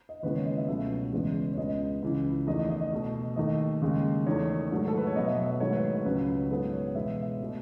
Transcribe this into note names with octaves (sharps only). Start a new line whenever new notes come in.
D#5
D#2 C#3 E3 G#3 B3 B4
C#5
D#5
E5
C#2 B2 F#3 A3 E5
E2 C#3 E3 G#3 B3
C#5
C#2 C#3 G#3 B3 D#5
C#2 C#3 E3
E2 D#3 A3 D#5
D#5
B2 A3
D#2 D#3 A3 D#5
D#2 C#3 G#3
E2 D#3 A3 C#5
G#2 D#3 F#3 A3
A4
B4
C#5
B2 F#3 B3 D#5
E5
D#5
D#5
G#2 D#3 F#3 A3 C#5
B4
C#5
C#5
C#2 C#3 F#3 B4
G#2 F#3 B3 A4
C#5
E2 B2 G#3 B3 E5
E5
B2 A3